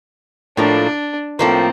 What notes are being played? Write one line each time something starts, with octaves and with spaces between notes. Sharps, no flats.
A2 F3 A#3 D4
A2 F3 A#3 C4